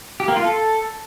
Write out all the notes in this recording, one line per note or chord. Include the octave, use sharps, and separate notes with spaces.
G4
A#3
F4
A4